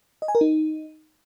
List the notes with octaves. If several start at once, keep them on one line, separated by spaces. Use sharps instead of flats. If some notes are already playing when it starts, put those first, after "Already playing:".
D#5
G#5
A#4
D#4